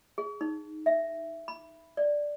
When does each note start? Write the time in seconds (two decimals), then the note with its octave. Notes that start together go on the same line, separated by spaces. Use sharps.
0.18 G#4
0.41 D#4
0.86 E5
1.48 B5
1.97 D5